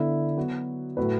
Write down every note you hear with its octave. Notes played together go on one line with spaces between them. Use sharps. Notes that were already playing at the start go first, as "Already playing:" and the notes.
Already playing: D3 B3 E4 A4 E5
F#3 B3 F#4
A2 F#3 A3 F#4 B4